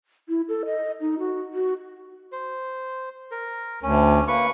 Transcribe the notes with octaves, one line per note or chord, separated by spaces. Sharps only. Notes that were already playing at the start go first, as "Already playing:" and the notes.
E4
A4
D#5
D#4
F#4
F#4
C5
A#4
D2 C#4
A#3 B4 C#6